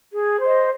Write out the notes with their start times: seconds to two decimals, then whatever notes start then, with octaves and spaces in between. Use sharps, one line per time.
0.12 G#4
0.41 C5 D#5